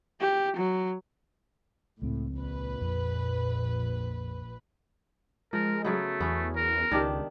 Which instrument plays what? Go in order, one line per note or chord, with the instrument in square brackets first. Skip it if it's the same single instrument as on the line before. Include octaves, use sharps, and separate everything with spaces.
[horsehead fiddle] G4
F#3
[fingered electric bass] C#2 G#3 C4 [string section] A2
[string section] A#1 B4
[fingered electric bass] F2
[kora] F3 [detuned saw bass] G#3 [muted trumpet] A#4
[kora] C#3 F#3 B3 [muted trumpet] A3
[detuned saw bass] E2 [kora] B3 C#4
[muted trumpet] A#4
[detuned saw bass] C#2 [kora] D#3 D4 G4